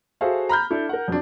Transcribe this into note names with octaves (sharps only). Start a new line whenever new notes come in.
F#4 G#4 A4 C5 E5 F5
A#5 B5 F6 G6
D4 E4 A4
A#4 F#5
F2 F#3 D4